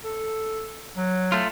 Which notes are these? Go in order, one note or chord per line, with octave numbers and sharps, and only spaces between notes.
A4
F#3
A3 F4